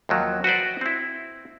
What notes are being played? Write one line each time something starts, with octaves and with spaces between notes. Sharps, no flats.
D#2 F3 F#3
F#4 B4 C5 D5
C4 E4